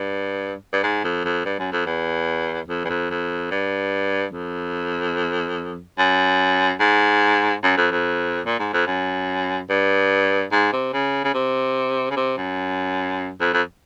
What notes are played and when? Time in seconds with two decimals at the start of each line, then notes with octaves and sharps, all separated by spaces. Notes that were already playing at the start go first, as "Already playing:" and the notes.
Already playing: G2
0.73 G2
0.83 G#2
1.04 F2
1.25 F2
1.45 G2
1.59 F#2
1.72 F2
1.86 E2
2.68 F2
2.85 E2
2.89 F2
3.10 F2
3.51 G2
4.33 F2
5.98 F#2
6.80 G#2
7.63 F#2
7.77 F2
7.91 F2
8.46 A#2
8.59 G#2
8.73 F2
8.87 F#2
9.70 G2
10.52 G#2
10.73 C3
10.93 C#3
11.24 C#3
11.34 C3
12.11 C#3
12.17 C3
12.37 F#2
13.40 F2
13.53 F2